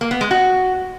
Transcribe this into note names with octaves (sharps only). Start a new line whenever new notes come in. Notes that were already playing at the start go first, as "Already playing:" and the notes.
A#3
B3
G#3
F#4